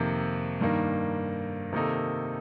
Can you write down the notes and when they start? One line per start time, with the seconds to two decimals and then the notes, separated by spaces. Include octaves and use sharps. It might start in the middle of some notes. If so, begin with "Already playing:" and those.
Already playing: F2 C3 D#3 A#3
0.61 G2 D#3 A#3
1.73 C3 D#3 A#3 D#4 A4